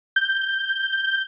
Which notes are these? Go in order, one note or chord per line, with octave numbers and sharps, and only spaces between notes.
G6